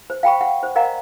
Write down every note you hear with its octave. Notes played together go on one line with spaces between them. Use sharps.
C5
F5 G5 B5 C#6
F#5
C5
A#4 D5 D#5 F5 F#5 A#5